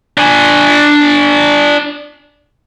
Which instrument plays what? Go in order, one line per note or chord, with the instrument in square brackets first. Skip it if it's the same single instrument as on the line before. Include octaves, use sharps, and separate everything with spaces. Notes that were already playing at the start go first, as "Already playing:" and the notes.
[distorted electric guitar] D4 G#5